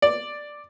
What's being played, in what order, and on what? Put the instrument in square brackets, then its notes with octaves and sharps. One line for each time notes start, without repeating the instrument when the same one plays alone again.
[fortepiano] D5